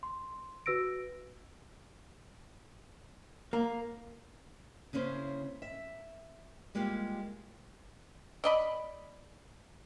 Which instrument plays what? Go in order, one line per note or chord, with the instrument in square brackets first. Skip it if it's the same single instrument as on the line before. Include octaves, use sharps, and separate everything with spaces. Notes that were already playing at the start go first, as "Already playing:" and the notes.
[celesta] C6
F#4 B4 E6 A#6 D7
[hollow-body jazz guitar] A#3
[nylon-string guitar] C#3 A#3 C#4 E4 C5
E5
G3 G#3 A#3 F4 G4
[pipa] D5 D#5 B5